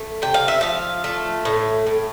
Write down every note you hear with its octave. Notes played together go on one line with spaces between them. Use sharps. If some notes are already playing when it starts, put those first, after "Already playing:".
Already playing: A3
C3 G5
F5
E5
F3 F5
A3
A2
A2